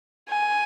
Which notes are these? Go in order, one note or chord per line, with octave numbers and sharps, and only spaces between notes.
G#5